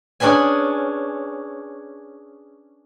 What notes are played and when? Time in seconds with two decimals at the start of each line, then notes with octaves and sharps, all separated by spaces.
0.20 C#4 D4 G#4 B4 G#5